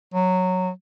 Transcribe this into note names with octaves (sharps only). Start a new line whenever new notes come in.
F#3